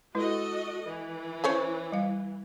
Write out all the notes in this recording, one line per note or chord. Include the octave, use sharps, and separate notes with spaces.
G#3 E4 F#4 A4 B4 D#5
E3
C#4 C5 C#5
G3 F5